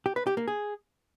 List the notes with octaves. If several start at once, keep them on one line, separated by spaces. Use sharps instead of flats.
G4
B4
G4
A#3
G#4